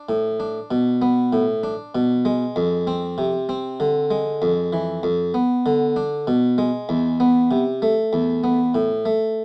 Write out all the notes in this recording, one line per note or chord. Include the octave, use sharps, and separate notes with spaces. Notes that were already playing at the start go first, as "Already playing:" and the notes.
Already playing: D4
A2
D4
B2
B3
A2
D4
B2
G#3
F2
C4
C3
C4
D3
G#3
F2
E3
F2
B3
D3
D4
B2
G#3
E2
B3
C3
A3
E2
B3
A2
A3